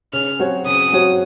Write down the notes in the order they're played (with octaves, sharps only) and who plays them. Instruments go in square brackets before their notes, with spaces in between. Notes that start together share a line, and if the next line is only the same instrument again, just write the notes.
[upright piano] C#3 [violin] F6
[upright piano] F#3 C4 F#4 C#5
[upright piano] C#3 [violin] D#6
[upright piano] F#3 C4 F#4 C#5